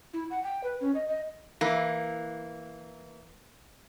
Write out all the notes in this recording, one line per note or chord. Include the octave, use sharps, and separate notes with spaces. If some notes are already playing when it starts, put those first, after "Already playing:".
E4
F#5
G5
B4
C#4
D#5
D#5
E3 A#3